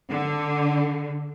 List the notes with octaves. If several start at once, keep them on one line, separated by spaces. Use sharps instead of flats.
D3